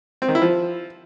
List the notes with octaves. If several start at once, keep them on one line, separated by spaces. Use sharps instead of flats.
C4
D#3
E4
F3